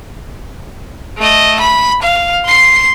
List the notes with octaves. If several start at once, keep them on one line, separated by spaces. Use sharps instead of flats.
A3 D#5
B5
F5
C6 C7